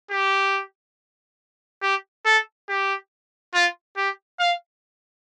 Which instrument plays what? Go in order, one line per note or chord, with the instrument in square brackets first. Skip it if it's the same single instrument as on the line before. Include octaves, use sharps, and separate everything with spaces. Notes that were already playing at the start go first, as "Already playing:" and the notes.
[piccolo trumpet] G4
G4
A4
G4
F4
G4
F5